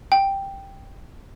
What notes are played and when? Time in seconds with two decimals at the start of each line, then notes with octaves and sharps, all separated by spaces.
0.12 G5